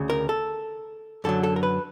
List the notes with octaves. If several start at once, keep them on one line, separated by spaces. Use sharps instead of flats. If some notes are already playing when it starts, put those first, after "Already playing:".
Already playing: D2 C#3
A#4
A4
F#2 D3 F#3 A4
A4
A#4
B4